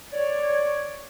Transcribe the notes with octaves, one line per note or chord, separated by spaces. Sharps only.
C#5 D5